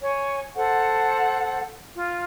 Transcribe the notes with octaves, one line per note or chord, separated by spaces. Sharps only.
C#5 G#5
A4 C5 F#5
F4